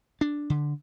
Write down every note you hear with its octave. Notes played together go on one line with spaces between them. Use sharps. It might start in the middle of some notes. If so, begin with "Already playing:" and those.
D4
D3